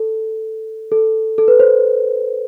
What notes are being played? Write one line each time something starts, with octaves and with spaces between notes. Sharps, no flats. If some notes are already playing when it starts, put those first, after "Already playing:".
Already playing: A4
A4
A4
B4
C5